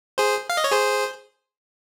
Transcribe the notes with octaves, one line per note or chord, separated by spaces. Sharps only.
G#4 C5
F5
D#5
C#5
G#4 C5